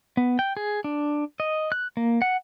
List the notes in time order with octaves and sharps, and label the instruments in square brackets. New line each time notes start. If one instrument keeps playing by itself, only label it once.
[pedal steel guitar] B3
G5
G#4
D4
D#5
F#6
A#3
F#5